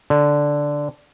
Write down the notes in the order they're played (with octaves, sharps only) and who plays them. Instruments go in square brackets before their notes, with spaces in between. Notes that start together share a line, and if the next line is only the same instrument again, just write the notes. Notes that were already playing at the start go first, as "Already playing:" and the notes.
[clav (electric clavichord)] D3